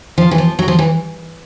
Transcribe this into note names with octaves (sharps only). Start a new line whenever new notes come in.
F3
E3
F3
F#3
F3
E3